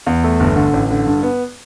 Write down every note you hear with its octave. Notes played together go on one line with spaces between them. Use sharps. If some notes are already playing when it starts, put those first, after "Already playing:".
E2
A3
G1
D3
A1
D3
G2
B3